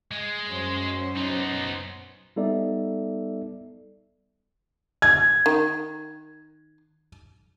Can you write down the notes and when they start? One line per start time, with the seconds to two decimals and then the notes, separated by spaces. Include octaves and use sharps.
0.11 G#3
0.48 F#2 C#4 C5
1.16 B3 D#4
2.36 G3 B3 D#4 A4 D5 E5
5.02 G#6
5.46 D#3